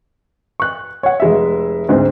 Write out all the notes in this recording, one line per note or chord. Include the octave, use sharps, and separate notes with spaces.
C#6 F#6
C#5 F#5
F1 G#3 E5
D2 G#2 C4